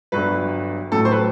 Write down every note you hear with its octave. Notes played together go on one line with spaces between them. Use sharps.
G1 G2 F#3 B4
A1 A2 F#3 A4
C5
B4